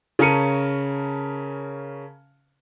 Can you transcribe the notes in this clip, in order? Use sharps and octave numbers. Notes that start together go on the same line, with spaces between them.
C#3 C#4 A#4 A5 C#7 D#7